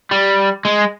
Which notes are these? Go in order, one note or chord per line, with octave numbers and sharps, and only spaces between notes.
G3
G#3